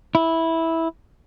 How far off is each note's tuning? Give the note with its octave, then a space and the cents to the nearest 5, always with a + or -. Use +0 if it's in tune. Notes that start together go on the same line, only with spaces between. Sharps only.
E4 -10